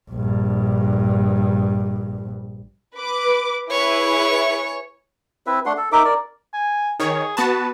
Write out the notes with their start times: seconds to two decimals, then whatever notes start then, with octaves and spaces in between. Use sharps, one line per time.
0.11 A#1 G2
2.95 B4 D6
3.71 E4 G#4 B4 C#5
5.47 C4 E4 B4 E5
5.66 A3 D4 F#5 C6
5.77 A4
5.92 D#4 A#4 E5 D6
6.05 A#4 D5
6.53 G#5
7.00 D#3 G#4 C#5
7.37 B3 F#4 B4 A5